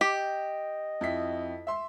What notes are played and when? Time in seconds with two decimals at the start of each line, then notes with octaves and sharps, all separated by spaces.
0.01 G4 D#5
1.01 F2 E4 B6
1.67 E5 C6